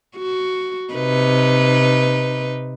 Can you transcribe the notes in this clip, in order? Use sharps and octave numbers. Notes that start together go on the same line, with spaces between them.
F#4
C3 D#4 B4